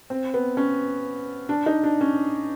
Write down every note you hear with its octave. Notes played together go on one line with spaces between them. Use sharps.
C4
B3
C#4
D4
D#4
D4
C#4